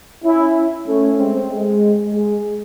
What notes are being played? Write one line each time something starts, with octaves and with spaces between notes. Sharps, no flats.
C#4 E4
A3 C#4
G#3 C4
G#3
G#3